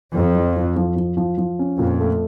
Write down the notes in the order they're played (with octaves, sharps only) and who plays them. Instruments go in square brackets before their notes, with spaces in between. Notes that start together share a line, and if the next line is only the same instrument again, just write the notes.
[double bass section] F2 [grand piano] F3
[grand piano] F3
F3
F3
F3
F3
F3
C#4
[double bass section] F2 [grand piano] A#2
[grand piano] A3